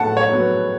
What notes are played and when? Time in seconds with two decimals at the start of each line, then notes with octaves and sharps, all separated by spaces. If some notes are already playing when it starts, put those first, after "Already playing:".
Already playing: A2 F#3 B3 F#5 A5
0.17 C#5
0.29 F#3 B3